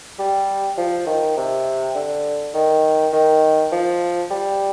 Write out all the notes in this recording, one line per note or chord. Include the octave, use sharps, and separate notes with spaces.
G3
F3
D#3
C3
D3
D#3
D#3
F3
G3